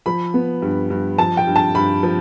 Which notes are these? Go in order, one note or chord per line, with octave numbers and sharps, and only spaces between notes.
F3 B5
B3
G2
G2
F3 A5
G5
G2
A5
G2 B5
F3